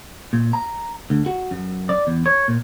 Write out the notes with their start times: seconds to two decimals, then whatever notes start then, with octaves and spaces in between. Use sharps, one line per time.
0.33 A#2
0.53 A#5
1.10 D2
1.26 F#4
1.51 F#2
1.89 D5
2.07 E2
2.26 C#5
2.48 A#2